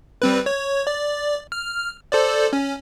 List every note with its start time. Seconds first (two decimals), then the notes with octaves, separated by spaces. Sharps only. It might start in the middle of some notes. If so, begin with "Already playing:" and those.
0.22 G3 C4 B4
0.46 C#5
0.87 D5
1.52 F6
2.12 A4 C5 D5
2.53 C#4